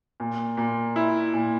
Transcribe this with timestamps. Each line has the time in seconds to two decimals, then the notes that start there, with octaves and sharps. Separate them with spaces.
0.20 A#2
0.57 A#2
0.96 E4
1.33 A#2